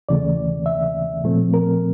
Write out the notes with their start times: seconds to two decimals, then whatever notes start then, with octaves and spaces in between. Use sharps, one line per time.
0.09 D#2 C#3 E3 A3 D5
0.66 E5
1.24 A#2 F3 A3 C4
1.54 A#4